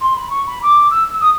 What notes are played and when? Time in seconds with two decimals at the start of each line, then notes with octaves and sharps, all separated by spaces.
0.01 C6
0.16 B5
0.30 C#6
0.47 B5
0.62 D6
0.91 E6
1.21 D#6